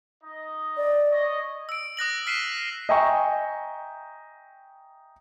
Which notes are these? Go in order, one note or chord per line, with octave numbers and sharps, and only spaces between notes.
D#4 D#5
D5
C#5 D#5
E6 D7
D#6 F#6 A#6 F#7
F6 B6 C7 D#7 E7 F#7
D#5 E5 G5 G#5 A#5 C#6